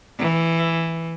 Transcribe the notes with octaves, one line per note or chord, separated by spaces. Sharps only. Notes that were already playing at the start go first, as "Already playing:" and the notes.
E3